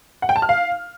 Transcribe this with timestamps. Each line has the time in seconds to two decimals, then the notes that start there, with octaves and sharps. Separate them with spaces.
0.22 F#5
0.29 G5
0.36 A5
0.42 F6
0.49 F5